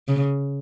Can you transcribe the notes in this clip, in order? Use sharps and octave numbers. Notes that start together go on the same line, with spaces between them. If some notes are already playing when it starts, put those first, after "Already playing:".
C#3